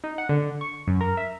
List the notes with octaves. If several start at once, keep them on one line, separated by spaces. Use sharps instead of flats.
D#4
F#5
D3
C#6
F#2
A#4
E5